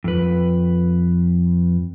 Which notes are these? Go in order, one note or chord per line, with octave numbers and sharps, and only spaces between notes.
F2 B4